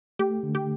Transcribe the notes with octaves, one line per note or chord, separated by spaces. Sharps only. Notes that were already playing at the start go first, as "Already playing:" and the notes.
A3 G4
D3
G4